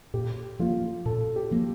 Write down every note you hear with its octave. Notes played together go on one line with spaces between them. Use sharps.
A#2 G4
F3 A#3 F4
A#2 A4
G4
F3 A#3